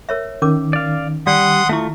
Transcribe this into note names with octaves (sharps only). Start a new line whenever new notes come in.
A#4 C#5 E5
D#3 C#4 A#4 D6
D5 F5
G3 D5 F#5 C6 D#6
A3 E4 F4 E5 C#6